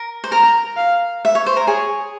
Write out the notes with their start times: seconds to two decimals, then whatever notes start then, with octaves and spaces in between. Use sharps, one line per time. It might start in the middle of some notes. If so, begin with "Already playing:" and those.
Already playing: A#4
0.24 C5
0.32 A#4 A#5
0.77 F5
1.25 E5
1.35 C#5
1.46 C5
1.57 A#4
1.67 G#4 C#5